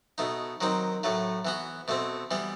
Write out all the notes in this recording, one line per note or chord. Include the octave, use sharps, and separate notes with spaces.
B2 A3 D#4
D#3 F#3 C4 D#4
A2 F#3 A3
E3 B3 F#4
B2 A3 C4
E3 G3 B3